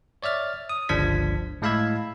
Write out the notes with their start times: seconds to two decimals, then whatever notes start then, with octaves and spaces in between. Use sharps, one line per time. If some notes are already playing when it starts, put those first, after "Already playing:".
0.23 C#5 D5 E5 F6 A6
0.69 D#6
0.89 G1 C#2 F3 D4 G#6 B6
1.62 A2 G#3 F5 B5 E6 G#6